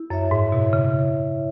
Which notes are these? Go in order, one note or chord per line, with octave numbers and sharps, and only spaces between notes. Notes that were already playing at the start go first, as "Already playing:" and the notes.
Already playing: E4
F#2 C#5 E5
G#2
B2 E4
C#3